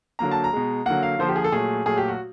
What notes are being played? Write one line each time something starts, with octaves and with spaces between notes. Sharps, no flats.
D3 F#3 A#3 A#5
A5
A#5
B2 G#3
D3 F#3 A#3 F#5
F5
D3 F3 A#3 C5
G4
G#4
A4
A#2 F#3 A3 G#4
A#2 F#3 A3 G#4
G4
F#4